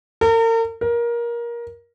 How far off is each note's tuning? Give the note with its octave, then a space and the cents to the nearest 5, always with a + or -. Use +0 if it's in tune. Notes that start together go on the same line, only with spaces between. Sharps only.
A#4 -40
A#4 +20